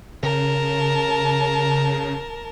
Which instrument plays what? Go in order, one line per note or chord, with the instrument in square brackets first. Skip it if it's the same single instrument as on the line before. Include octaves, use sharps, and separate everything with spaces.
[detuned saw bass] C#3 [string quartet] A#4 A5